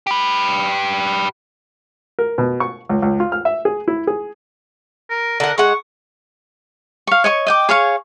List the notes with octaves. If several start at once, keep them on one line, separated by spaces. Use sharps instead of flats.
G4 B4
A#4
B2
C#6
C#2
C#2
F4
F6
E5
G#4
E4
G#4
A#4
D3 A#4 F#5
G#3 F#5 C#6
F5 C#6
C#5 D#5 C#6
D#5 G5 D6
G#4 C#5 F5 C#6